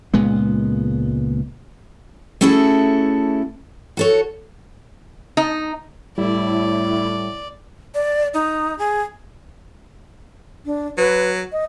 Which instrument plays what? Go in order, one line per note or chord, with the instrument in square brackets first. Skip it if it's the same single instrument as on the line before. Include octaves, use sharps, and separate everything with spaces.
[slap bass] C#2 A#2 G#3 B3
[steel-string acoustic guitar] A3 C#4 E4 F#4 G#4 A4
F#4 A4 C#5
[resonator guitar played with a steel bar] D#4
[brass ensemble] A2 [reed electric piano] G3 [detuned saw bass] E4 [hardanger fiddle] D5
[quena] D5
D#4
G#4
[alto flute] D4
[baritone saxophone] F#3 [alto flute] B4
[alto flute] D#5